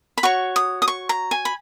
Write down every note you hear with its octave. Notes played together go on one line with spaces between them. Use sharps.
B5
F#4 C#5 C#6
D#6
D#6
C#6
A#5
G#5
B5